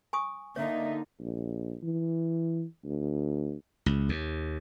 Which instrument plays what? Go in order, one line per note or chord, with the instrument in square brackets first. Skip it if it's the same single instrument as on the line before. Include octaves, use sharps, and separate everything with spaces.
[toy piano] G#5 C#6 D#6
[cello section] D3 D#4 [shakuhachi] A#3 [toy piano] C#5 [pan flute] E5
[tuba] A#1
E3
D2
[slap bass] C#2
D#2